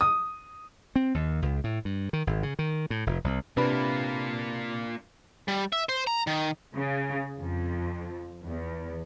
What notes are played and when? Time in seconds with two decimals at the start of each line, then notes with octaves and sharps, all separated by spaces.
0.01 D#6
0.96 C4
1.14 D#2
1.42 C#2
1.64 A2
1.85 G2
2.13 D#3
2.27 G#1
2.43 C#3
2.59 D#3
2.90 A2
3.06 F1
3.24 C2
3.57 C3 A#3 D4 F4 B4 B5
5.48 G3
5.73 E5
5.89 C5
6.07 A#5
6.27 D#3
6.75 C#3
7.37 F2
8.46 E2